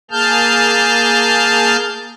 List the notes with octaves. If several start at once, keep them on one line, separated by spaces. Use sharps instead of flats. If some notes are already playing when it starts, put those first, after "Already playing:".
A#3 G#4 A5 F6 G6